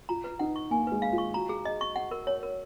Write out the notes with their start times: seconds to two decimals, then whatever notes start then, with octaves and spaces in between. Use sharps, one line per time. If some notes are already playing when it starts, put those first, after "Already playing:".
0.09 F4 A#5
0.24 B4
0.39 D#4 F#5
0.56 C#6
0.71 A#3 G#5
0.87 G#3 B4
1.02 F5
1.12 F4
1.18 C#6
1.34 F#4 A#5
1.49 G#4
1.65 D#5
1.81 C#6
1.96 F#5
2.11 A#4
2.27 C#5
2.43 A#4